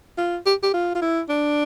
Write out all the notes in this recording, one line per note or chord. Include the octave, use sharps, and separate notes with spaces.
F4
G4
G4
F4
F4
E4
D4